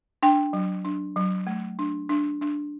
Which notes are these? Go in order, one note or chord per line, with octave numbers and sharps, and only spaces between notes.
D4 G5
F#3
D4
F#3
A3
D4
D4
D4